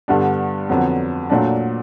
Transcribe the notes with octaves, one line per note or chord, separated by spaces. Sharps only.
G2 D3 G3 B3 D4
F2 D3 F#3 B3
A#2 F#3 A3 D4